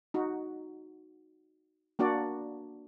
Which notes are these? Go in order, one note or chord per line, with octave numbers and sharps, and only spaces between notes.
D#4 F#4
A#3 D4 F#4 D5